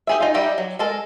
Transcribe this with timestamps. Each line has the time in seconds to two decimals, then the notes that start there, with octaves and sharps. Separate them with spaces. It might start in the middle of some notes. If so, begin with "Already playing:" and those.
0.07 G4 G#4 E5
0.20 D#4 F4
0.34 G3 D#4 G4 E5
0.58 F#3
0.79 G#3 A4 A#4